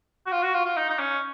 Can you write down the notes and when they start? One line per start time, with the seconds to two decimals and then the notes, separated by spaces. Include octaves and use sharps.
0.27 F#4
0.32 F4
0.42 F#4
0.54 F4
0.65 F4
0.77 D#4
0.90 D#4
0.99 C#4